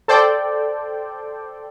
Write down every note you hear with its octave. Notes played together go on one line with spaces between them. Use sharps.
A4 C5 D5 G5